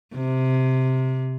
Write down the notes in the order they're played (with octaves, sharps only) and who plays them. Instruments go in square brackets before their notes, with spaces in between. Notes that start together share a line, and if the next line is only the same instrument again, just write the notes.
[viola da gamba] C3